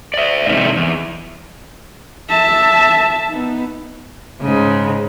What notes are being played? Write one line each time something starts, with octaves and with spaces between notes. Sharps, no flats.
D5 E5
G#2 C3 D#4 E4
E2
E5 A5
B3 D#4
G#2 C#3